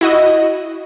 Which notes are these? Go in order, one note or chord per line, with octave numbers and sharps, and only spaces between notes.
E4 F#4 D#5